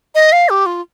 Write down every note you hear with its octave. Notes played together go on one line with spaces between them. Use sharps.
D#5
F5
G4
F4